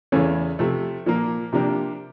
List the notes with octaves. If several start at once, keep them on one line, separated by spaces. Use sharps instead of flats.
E2 C#3 E3 A3 C#4
C3 F3 A3
A#2 F3 A#3
C3 F3 A#3 D4 G4